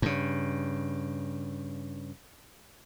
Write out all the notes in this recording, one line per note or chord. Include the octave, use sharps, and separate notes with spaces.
G2 C#3